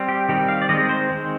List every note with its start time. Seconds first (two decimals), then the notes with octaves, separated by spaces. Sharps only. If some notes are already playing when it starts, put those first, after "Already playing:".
Already playing: G3 C4
0.09 G4
0.29 D#3 G3 C4 G4
0.48 F5
0.62 D5
0.69 D#3 G#3 C4 D#5
0.89 C5
1.10 D#3 G#3 C4